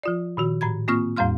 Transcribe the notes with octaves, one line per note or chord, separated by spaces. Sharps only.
F3 F4 D5
A#2 D#3 F#4
A2 A#5 B5 G#6
A#3 C4 F4 C#6 F6
E2 A2 G3 F5 C6 F6